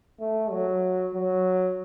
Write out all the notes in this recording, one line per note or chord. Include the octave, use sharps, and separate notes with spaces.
A3
F#3
F#3